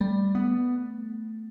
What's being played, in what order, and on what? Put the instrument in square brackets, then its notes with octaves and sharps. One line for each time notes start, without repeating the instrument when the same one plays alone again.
[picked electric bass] G3 [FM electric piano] A3
[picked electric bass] B3